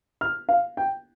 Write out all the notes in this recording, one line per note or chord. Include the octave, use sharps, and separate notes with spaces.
F6
F5
G5